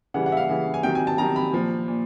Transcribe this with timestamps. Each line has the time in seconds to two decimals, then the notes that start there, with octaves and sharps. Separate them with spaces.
0.14 C#3 E3 G3 F#5
0.26 F#5
0.32 E5
0.37 F5
0.49 C#3 E3 G3
0.74 G#5
0.83 C3 D#3 F#3 G5
0.95 G#5
1.07 A5
1.18 C3 D#3 F#3 A#5
1.36 B5
1.52 A#2 F3
1.88 A#2